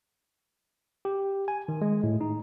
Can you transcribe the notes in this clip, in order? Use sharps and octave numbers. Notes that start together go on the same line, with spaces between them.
G4
G#5
D#3
G#3
A2
D#4